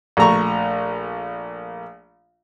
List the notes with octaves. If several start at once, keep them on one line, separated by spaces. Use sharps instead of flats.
A#1 A3 A#5 C#6